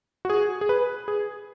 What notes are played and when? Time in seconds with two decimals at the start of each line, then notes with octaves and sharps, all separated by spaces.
0.25 F#4
0.30 G#4
0.61 G#4
0.69 B4
1.08 G#4